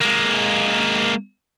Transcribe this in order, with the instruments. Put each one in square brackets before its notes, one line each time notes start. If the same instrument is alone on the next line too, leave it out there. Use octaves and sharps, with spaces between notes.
[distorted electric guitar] G#3 A#3